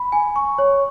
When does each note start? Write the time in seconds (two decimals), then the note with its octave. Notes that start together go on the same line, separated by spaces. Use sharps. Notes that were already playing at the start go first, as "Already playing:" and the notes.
Already playing: B5
0.12 G#5
0.36 C#6
0.58 C#5